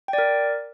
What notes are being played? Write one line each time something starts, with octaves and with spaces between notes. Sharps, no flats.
G5
D5
A#4